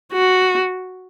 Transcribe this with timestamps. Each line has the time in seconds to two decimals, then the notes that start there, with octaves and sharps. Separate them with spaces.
0.13 F#4